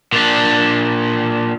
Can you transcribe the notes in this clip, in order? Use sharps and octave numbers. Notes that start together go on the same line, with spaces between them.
A#2 D4